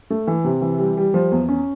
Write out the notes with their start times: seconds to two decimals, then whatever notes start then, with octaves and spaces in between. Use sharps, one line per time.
0.10 A3
0.27 E3
0.44 C3
0.62 E3
0.79 G3
0.97 G3
1.14 F3
1.32 E2
1.49 C#4